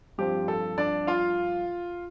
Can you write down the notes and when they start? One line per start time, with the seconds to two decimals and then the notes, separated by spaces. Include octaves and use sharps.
0.18 G2 F3 C4 G4
0.48 A4
0.78 D4 D5
1.07 F4 F5